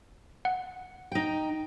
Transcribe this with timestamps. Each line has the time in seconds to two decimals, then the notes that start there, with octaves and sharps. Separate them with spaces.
0.45 F#5
1.12 D#4 G5